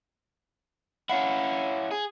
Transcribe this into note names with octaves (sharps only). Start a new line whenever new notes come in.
C#4 E4 F5 F#5
G#4